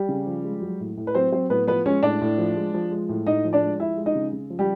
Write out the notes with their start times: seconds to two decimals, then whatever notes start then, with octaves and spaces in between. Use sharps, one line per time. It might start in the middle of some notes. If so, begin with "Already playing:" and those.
Already playing: G3 G4
0.09 C#3
0.27 F3
0.44 G#3
0.62 F#3
0.80 A2
0.97 A2
1.07 B4
1.15 F#3 C4 C5
1.32 F#3 C4 C5
1.50 A2 B3 B4
1.68 F3 B3 B4
1.86 G#3 C#4 C#5
2.03 A2 D4 D5
2.21 A2
2.38 F3
2.56 G#3
2.74 F3
2.92 G#3
3.09 A2
3.26 A2 D#4 D#5
3.45 F3
3.53 D4 D5
3.63 G#3
3.80 F3 E4 E5
3.97 G#3
4.06 D#4 D#5
4.15 C#3
4.33 C#3
4.50 F3
4.59 G3 G4